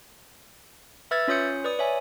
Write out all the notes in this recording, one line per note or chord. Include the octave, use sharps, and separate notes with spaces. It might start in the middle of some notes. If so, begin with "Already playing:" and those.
B4 E5 E6 F6 G#6 A6
C#4 F4 C#5 D#6 G6 C#7
B4 D5 D#6
C#5 E5 G#5